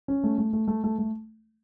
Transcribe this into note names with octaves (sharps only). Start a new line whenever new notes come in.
C#4
A3
A3
A3
A3
A3
A3